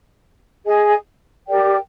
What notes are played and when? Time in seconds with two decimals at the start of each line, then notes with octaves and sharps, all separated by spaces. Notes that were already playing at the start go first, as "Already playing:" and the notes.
0.65 G#4 D#5 G#5
1.47 G4 A#4 D5 G5